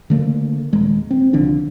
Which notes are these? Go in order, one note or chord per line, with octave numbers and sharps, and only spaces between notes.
D3 A3 A#3
D#1 G#3
C4
C2 D3 F3 D4